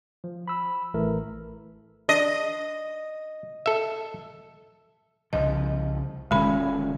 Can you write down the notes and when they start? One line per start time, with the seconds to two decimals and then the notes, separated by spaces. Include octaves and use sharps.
0.24 F3
0.48 B5 E6
0.94 A1 E3 A3 A#4
2.09 D4 D#5
3.66 A4 E5
5.33 C2 C#3 F3 D#5
6.31 D#1 D3 G#3 C#4 B5